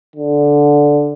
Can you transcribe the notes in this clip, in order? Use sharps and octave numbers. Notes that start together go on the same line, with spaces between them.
D3